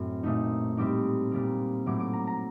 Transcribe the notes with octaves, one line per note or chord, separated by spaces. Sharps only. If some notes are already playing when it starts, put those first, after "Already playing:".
Already playing: F#2 A2 C4
A#2 A3 D#4
A2 G3 C4 D#4 D6
A#2 G3 A#3
A2 F#3 A3 D6
D6
A#5
A#5